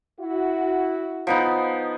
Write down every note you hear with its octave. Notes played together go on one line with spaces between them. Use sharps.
E4 F#4
F3 B3 D#4